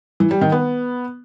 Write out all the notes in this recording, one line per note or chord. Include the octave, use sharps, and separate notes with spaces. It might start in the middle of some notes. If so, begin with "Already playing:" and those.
E3
G3
D#3
B3